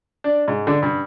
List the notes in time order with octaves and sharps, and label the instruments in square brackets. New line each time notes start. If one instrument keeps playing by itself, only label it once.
[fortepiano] D4
G#2
D3
G2